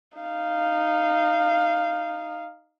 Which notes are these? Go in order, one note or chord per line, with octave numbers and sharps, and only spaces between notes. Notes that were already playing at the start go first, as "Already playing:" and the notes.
D#4 F5